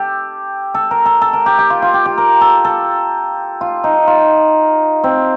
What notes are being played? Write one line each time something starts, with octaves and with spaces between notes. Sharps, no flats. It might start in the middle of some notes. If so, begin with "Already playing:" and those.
Already playing: G4 A4
A4
A#4
A4
A4
A#4
G4
G4
F4
F4
G4
G4
A#4
A4
A4
F4
D#4
F4
C4